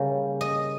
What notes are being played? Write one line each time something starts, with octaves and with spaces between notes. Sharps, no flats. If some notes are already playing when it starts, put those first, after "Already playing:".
Already playing: C#3 G3 A#3 C#4
D#5